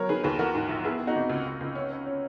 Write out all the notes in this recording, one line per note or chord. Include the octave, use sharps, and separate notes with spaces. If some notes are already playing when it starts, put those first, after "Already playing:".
Already playing: F#3 A#4 C#5
D#3 G#4 B4
D#2 G#4 B4
E3 F#4 A#4
G#2
A#1
B3 E4 G#4
B3
D#4 F#4
G#1
C#2
C#2
C#2
C#4
C#4
C#4